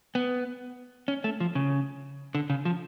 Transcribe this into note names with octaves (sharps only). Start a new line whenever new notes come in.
B3
C#4
A3
F3
C#3
D3
C#3
F3